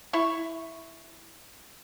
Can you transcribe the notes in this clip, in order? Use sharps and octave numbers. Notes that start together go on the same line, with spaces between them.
E4 C#6